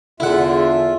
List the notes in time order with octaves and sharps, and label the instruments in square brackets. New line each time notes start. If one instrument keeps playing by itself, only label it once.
[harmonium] E2 F4 E5 [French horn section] D3 G#4 [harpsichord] E4 F#5